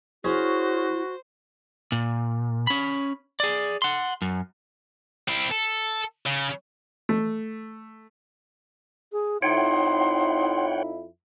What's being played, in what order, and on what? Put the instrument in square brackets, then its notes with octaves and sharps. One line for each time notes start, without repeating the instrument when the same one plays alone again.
[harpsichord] C#4 G#4 [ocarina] E4 [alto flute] F#4 [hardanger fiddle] C5
[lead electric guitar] A#2
C#4 B5
G#4 D5
F#5 C6
F#2
[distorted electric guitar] C4 E4
A4
C#3
[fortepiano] A3
[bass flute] G#4
[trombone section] F2 E4 [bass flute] D#4 [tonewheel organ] C#5 F#5 G5 [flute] C6